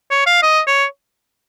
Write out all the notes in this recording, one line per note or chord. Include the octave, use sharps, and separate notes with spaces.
C#5
F5
D#5
C#5